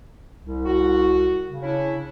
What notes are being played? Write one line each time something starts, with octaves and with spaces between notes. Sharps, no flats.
C2
F#4
C#3
C#4 D4 E4